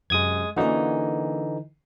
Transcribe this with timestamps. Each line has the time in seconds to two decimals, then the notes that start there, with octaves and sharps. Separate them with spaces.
0.10 F#2 C3 G#3 D#6 G#6
0.56 D3 E3 A#3 C#4 D#4 F#4